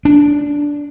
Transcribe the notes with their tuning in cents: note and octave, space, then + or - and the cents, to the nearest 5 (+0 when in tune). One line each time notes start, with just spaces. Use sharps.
D4 -10